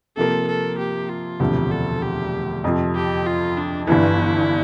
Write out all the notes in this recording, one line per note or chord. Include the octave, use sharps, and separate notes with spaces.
C3 F3 A#3 A4
A4
G4
F4
E1 D2 C3 F3 G4
A4
G4
F2 C3 F3
G4
F4
D4
G1 G2 E3 E4